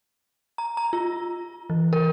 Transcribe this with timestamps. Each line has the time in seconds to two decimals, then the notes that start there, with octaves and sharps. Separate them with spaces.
0.58 A#5
0.77 A#5
0.93 F4
1.70 E3
1.93 A#4